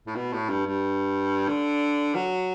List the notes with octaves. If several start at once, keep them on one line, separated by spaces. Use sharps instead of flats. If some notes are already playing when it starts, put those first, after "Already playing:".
A2
B2
A2
G2
G2
D3
F#3